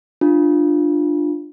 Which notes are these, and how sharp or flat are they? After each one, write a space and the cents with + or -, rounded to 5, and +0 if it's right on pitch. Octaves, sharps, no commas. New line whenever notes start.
D4 +20 F4 +0